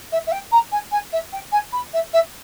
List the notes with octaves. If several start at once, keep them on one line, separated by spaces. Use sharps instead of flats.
E5
E5
G5
A#5
G#5
G#5
E5
G5
G#5
B5
E5
E5